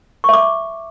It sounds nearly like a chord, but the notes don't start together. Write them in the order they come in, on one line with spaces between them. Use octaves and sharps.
C#6 E5 D6